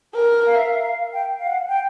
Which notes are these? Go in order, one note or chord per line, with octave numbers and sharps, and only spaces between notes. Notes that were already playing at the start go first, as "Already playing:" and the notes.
A#4
F5
E5
F5
F5
G5
F5
F#5
G5